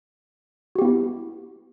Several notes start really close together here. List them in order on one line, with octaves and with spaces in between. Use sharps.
F#4 G4 B3 E4